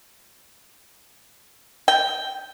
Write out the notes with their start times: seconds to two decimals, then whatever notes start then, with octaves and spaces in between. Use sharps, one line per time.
1.88 G5